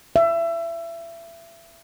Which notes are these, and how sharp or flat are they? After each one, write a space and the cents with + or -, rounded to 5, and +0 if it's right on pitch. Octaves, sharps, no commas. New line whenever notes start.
E5 +25